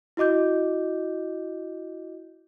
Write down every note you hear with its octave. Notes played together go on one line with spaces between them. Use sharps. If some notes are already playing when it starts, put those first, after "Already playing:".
E4 F#4 D#5 D6 G6